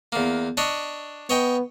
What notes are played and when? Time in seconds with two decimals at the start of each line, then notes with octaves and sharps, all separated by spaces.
0.12 E2 A#3
0.57 D4 C#5 D#5
1.29 B3 C#5 D#5 G5